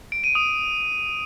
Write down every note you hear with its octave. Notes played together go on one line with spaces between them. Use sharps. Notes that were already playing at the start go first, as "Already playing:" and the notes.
D7
D#7
D#6